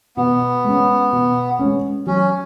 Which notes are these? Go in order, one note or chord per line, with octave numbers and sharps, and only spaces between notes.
B2 B3
G#3 C#4
B2
G#3 C#4
F#3 C#4